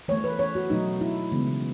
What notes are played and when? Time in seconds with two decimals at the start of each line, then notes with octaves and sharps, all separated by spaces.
0.08 E3 A3 C#5
0.24 B4
0.39 C#5
0.55 F#4
0.70 B2 F#3 A3 D#4
1.01 E4
1.32 C#3 E3 G#3 B3